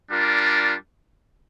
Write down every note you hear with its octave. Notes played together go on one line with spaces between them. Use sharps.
G3 D4 F4 A#4